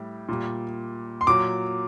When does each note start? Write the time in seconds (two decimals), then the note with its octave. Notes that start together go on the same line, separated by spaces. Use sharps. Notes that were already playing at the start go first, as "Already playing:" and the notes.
Already playing: A2 G3
0.29 A#2 G3
1.21 C6
1.27 A#2 F#3 D6